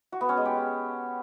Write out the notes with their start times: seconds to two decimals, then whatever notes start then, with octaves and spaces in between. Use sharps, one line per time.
0.12 F#4
0.21 B3
0.29 C#4
0.37 G#3
0.45 G4